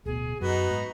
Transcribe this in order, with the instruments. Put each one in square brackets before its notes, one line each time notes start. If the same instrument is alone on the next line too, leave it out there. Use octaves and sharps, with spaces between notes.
[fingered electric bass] D1 B2 [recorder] G#4
[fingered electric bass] F#2 [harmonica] B3 D#4 [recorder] F#4
[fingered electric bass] G#2